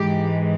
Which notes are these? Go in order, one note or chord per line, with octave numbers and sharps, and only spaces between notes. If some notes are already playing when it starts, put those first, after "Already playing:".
Already playing: G#2 E3 G#3 G4